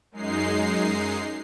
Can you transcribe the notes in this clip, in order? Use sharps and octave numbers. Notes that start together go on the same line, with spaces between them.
F#2 G#3 D#4 C7